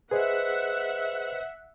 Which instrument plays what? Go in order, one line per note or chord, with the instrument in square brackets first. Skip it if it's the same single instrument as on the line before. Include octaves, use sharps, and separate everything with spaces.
[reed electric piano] G#4 [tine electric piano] B4 C5 D#5 [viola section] E5 F#5